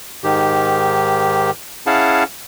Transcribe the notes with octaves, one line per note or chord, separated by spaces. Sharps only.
G#2 D#3 G4
C#4 E4 G#4 F5 F#5 A5